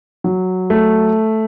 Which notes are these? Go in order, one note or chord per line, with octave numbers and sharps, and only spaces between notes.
F#3
A3